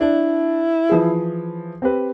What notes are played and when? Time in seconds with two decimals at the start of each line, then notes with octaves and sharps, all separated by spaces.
0.01 D4 E4
0.89 E3 F3 G#4
1.82 C4 G4 B4